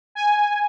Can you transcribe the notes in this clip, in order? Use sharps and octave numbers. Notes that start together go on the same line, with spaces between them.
G#5